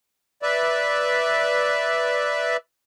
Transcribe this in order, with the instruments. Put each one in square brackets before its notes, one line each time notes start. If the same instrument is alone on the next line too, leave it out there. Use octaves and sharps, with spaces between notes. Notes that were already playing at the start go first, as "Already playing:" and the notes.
[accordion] B4 D5 E5